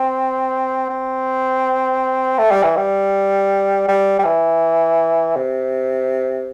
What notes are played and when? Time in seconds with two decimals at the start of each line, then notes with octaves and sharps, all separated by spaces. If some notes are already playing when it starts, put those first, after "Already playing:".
Already playing: C4
0.90 C4
2.39 A3
2.51 G3
2.63 E3
2.77 G3
3.88 G3
4.19 G3
4.25 E3
5.37 C3